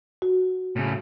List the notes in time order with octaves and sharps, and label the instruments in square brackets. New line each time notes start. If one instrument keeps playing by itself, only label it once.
[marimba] F#4
[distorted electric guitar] A2 C#3